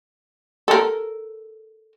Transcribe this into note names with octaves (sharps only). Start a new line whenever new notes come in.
A4 A#4